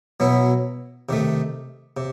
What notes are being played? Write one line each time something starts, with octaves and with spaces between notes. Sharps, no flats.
B2 F#3 B3 E4
C3 D#3 A3
C3